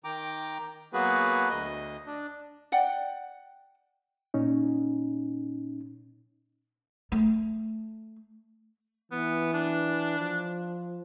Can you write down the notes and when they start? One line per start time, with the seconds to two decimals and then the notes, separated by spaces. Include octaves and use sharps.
0.04 D#3 G5 A#5 D6
0.93 F#3 A#3 B3 F#4 G#4 B4
1.49 D2 D#5
2.07 D4
2.72 D5 F#5 G5
4.34 A#2 C#4 D#4
7.12 A3
9.12 E3 B3
9.54 D4
10.19 F3